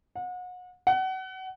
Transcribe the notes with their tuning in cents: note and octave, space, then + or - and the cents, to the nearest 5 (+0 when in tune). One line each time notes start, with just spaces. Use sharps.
F#5 -35
F#5 +30